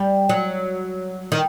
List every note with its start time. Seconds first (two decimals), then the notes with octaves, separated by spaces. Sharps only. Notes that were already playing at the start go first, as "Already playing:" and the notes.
Already playing: G3
0.29 F#3
1.32 D#3